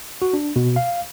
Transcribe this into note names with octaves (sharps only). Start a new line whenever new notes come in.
F#4
D4
B2
F5